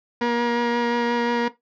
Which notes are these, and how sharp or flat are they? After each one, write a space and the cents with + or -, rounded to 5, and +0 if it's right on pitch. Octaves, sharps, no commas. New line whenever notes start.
A#3 +35